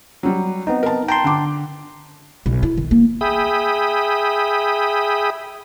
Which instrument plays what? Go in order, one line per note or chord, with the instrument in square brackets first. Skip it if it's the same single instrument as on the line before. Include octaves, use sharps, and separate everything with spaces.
[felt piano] F#3 G3
[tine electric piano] B3 C4 D#4
[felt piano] A#4 A5
[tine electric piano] G5 A5 C6 [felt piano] A#5
[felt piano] D3 D6
[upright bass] B1
E4
D#3
A#3
[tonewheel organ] G#4 E5 G5 B5 D#6